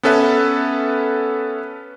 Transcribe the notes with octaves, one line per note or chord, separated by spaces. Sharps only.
B3 C#4 A4 B4 E5